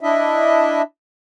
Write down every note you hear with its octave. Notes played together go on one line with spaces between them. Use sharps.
D4 E4 D#5 E5